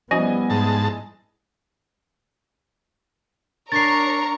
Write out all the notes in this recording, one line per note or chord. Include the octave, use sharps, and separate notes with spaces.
F3 G3 B3 C#4 E4 F#4 D#5 G#5
G#2 A5
D4 A#4 C#5 A#5 C#6 A6 C7